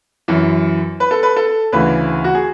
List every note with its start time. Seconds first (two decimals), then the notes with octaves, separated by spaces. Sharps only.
0.28 F#2 E3
1.00 B4
1.11 A4
1.23 B4
1.36 A4
1.72 D2 C#3 E3 B4
2.24 F#4
2.35 G#4